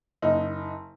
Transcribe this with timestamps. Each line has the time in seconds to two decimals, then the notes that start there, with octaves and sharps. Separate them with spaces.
0.22 F#1 D#4